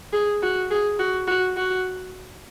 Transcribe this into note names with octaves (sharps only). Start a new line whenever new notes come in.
G#4
F#4
G#4
F#4
F#4
F#4